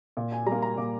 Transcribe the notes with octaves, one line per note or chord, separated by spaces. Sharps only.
A#2
G#5
G3 A#5
A#3
A#5
A#2 D6